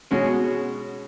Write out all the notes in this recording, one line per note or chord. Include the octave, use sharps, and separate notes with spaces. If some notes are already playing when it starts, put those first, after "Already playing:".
B2 G#3 C#4 F#4 C#5